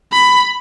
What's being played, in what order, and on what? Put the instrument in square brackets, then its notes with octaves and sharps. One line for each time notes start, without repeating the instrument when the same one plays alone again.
[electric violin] B5